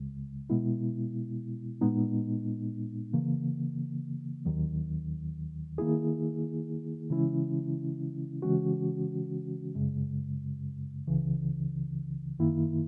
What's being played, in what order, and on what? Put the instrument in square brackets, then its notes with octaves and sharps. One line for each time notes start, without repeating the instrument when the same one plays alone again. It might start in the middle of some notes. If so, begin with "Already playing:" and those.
Already playing: [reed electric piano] C#2 C#3 G#3
B2 G#3 B3 E4
A#2 G#3 B3 D#4
C#3 E3 A#3
D#2 D#3 F#3
D#3 A#3 E4 G#4
C#3 E3 G#3 C#4 E4
C#3 E3 G#3 C#4 F#4
F#2 C#3 G#3
C#2 C#3 E3
F#2 D#3 A#3 E4